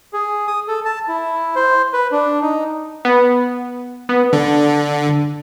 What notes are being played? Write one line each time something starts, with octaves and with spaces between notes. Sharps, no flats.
G#4
D#6
A4
A5
E4
C5
B4
D4
D#4
B3
B3
D3